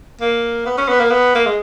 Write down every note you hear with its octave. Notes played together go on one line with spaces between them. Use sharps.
A#3
B3
C#4
B3
A#3
B3
A#3
G#3